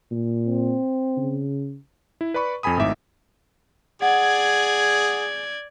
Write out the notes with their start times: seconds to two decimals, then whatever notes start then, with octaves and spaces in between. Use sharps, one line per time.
0.11 A#2
0.47 C4
1.17 C#3
2.21 E4
2.34 B4 D5 B5 C#6
2.63 F2 A4 G#5 B5 D#6
2.77 G#1 A2 D#4 E5 D6
4.02 G#4 D5 F#5 G#6